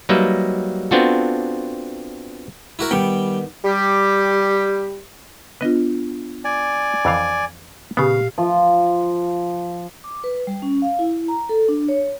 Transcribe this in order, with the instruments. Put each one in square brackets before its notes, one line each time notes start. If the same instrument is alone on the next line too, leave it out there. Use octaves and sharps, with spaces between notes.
[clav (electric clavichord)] F#3 G3 A#3 D#4 B4 E5
B3 C4 D4 F4 F#4 A4
[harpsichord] E4 F#4 A#4
[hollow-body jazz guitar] D#3 B3 [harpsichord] G3 G5
[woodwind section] G3 G4
[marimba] B3 D4 F4 [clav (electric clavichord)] B4 D#5
[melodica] D5 G#5
[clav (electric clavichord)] F2 E3 F5
[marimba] A#2 G4 [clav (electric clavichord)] C#3 B3 [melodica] F5
[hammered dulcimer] F3
[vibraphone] D6
B4
G3
C#4
F5
E4
A#5
A4
D4
C#5